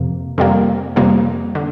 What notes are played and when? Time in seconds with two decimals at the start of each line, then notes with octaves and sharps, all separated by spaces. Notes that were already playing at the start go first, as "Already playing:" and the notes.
Already playing: F2 C3 A#3
0.38 F2 C3 G3 A#3
0.96 F2 C3 G3 A#3
1.55 D3